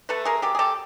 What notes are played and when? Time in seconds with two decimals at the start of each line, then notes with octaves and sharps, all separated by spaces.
0.09 A3 A4 B4
0.25 G#4 A#4
0.42 F#3 G4 A4
0.55 G#4
0.59 G4 A4